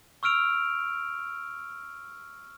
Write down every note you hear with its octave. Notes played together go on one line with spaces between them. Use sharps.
C#6 E6 F6 D7 F7